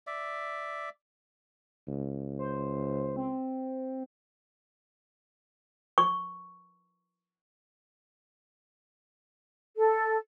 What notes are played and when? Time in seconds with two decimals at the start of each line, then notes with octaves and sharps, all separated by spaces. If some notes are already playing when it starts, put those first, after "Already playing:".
0.07 D5 E5
1.87 C#2
2.39 C5
3.16 C4
5.98 C#6
9.77 A4